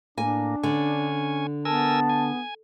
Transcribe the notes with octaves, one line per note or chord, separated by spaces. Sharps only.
A2 A#3 D4 G#5
D3 C#4 G#5
B3 A#4 G#5 A5 E6
G#5